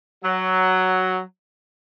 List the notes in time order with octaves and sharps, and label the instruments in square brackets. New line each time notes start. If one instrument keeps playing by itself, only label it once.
[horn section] F#3